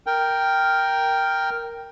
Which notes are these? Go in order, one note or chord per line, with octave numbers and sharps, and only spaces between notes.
A#4 G5